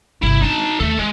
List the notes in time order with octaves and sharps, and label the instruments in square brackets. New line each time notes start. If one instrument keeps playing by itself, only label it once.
[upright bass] G1 C3 [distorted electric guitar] E4
[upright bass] D4 [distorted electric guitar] D#4 A5
[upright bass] D#2 D3 [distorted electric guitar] A3 A4
[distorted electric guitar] G#3 [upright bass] B3